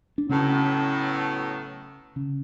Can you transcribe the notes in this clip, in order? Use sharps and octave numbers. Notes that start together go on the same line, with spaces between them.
D4
A2 C#3 F#3 B3 C#4
C#3 C#4